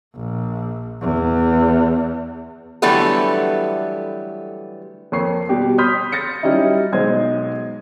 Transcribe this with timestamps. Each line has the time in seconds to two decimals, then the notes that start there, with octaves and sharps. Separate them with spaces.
0.16 A#1
1.01 E2
2.82 D3 E3 F#3 G3 A3 B3
5.12 F2 A#3 C#5 C#6 C7
5.49 B2 G3 G4
5.78 B5 C6 D#6 F6 G6 B6
6.12 G6 A6 A#6 C#7
6.43 F#3 G3 C#4 D#4 E4
6.92 B1 G#3 C5 D#5 G#6